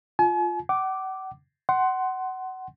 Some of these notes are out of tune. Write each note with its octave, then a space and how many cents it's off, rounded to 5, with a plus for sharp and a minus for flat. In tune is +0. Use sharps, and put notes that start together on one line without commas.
F4 +0 G#5 +45
F#5 +40 D6 +0
F#5 +20 C6 +0